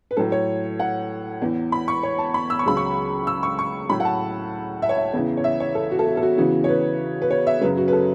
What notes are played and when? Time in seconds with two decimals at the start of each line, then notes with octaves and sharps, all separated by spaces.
0.11 B4
0.17 A2 F#3 A4
0.32 C#5
0.80 F#5
1.42 E2 E3
1.72 B5
1.88 C#6
2.03 C#5
2.19 A5
2.34 B5
2.50 E6
2.59 C#6
2.66 C#2 C#3 F#3 B5
2.77 C#6
3.27 E6
3.43 C#6
3.59 C#6
3.90 A2 F#3 B5
4.00 F#5
4.05 A5
4.82 E5
4.89 C#5
4.97 E5
5.13 E2 C#3 E3
5.37 C#5
5.44 E5
5.60 C#5
5.75 A4
5.91 F#4
5.99 A4
6.07 F#4
6.17 A4
6.23 F#4
6.38 E2 C#3 E3 F#4
6.64 C#5
6.69 B4
7.22 B4
7.31 C#5
7.47 E5
7.61 F#2 C#3 F#3 B4
7.77 F#4
7.88 B4
7.93 A4